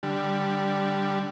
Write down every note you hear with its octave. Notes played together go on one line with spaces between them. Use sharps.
D3 G3